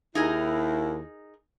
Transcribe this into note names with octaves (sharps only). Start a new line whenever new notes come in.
D#2 D#4 E4 G#4 A#4